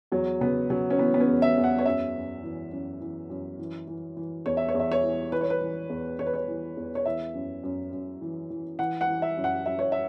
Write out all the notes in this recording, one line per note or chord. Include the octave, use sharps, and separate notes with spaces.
E2 F#3
C#3 B3
C#3 F#3
C#4
E3 B3
B3
C#4
E2
E5
E2
F#5
C#5
F#2 E5
F#2
E3
F#2
E3
F#2
E3
E3
E3
E2 C#5
E5
C#5
E2 E5
C#5
E3
E3 B4
C#5
B4
E3
E2
E2 C#5
B4
C#5
E3
E2
C#5
E3 E5
F#2
F#2
F#2
E3
E3
E3 F#5
F#5
E3
E5
F#2
F#5
F#2 E5
C#5
E5